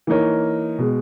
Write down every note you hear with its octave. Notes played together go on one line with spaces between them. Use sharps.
E3 A#3 D#4 A#4 C#5
B2 G#3